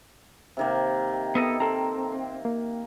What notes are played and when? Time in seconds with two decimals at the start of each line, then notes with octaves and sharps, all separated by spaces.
0.57 C3 D#3 A#3
1.35 B3 A4 D#5
1.60 C4 A4 A#5
2.45 A#3